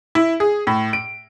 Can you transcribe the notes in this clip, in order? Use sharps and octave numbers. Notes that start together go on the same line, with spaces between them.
E4
G#4
A2
D7